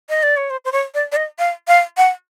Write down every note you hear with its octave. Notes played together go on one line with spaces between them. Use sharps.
D#5
D5
C#5
C5
C5
C#5
D5
D5
D#5
F5
F5
F#5